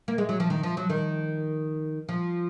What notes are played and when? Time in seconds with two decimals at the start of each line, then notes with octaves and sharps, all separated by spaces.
0.08 A#3
0.18 G#3
0.29 F#3
0.40 F3
0.50 D#3
0.63 F3
0.77 F#3
0.90 D#3
2.09 F3